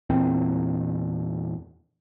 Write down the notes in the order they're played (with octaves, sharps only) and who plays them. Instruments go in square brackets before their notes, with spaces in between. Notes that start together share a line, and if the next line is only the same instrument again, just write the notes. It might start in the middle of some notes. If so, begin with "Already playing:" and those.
[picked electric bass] E2 A#2 C4